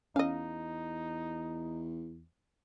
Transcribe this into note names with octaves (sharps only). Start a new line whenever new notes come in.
E2 C#4 D#4 D#5 F5